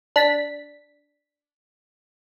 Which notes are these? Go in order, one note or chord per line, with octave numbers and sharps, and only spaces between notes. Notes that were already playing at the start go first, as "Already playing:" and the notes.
D4 B6